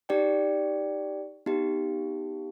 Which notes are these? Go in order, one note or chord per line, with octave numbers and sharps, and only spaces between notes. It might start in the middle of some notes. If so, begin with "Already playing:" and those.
D#4 G4 D5 G5
B3 D#4 G4